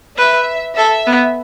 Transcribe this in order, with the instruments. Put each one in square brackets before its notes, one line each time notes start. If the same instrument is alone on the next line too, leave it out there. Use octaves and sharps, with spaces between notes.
[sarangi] B4 [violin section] E5
[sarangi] A4 [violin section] E5
[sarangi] B3